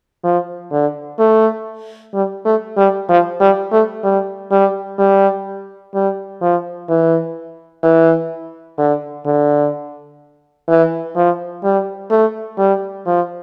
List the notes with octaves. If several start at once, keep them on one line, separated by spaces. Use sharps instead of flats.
F3
D3
A3
G3
A3
G3
F3
G3
A3
G3
G3
G3
G3
F3
E3
E3
D3
D3
E3
F3
G3
A3
G3
F3